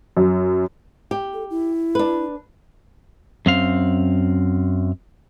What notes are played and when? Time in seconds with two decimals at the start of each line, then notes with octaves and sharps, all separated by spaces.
0.17 F#2
1.11 G4
1.33 A4
1.50 E4
1.95 D4 B4
3.46 F#2 C4 F5